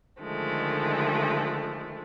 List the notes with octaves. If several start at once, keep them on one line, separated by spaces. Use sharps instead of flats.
D3 D#3 F3 G#3 A3